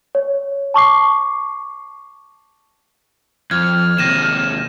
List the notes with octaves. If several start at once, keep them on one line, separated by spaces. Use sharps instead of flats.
C#5
A5 C#6 D6 C7
F2 F6 G#6
D#2 C3 A#6 D#7 E7